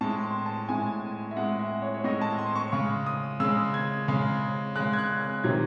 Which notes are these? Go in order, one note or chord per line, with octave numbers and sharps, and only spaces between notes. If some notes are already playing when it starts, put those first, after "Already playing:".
A2 G#3 A5
C6
A5
A2 G#3 G#5
E5
A2 G#3 F#5
E5
C#5
C#5
A2 G#3 D#5
A5
C6
C#6
C#3 G#3 C#6
D#6
C#3 G#3 E6
G#6
C#3 G#3
C#3 G#3 F#6
G#6
F#6
F#6
C3 D#3 F#3 G#6